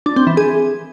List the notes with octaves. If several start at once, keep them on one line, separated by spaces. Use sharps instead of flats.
D4
C4
E3
G#4